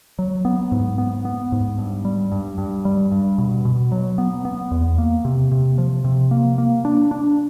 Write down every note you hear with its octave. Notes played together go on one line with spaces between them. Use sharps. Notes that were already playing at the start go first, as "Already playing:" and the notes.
F#3
B3
G#2
B3
B3
G#2
G2
G3
G2
G2
G3
G2
B2
B2
F#3
B3
B3
E2
A#3
C3
C3
F3
C3
A#3
A#3
D4
D4